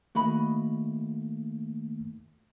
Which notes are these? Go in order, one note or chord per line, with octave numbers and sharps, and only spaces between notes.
D#3 A3 A#3 F#4 D#5 B5